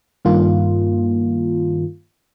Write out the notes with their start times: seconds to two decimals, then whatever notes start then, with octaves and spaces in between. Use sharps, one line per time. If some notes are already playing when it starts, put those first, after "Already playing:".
0.25 G2 D#3 A#3 F4